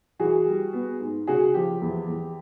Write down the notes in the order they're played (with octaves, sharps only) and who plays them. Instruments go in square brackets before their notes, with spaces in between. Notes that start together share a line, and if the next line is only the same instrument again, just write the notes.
[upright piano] E3 F#4 G#4
G3
B3
G#2
C#3 F#4 G#4
F3 G4
E2
E2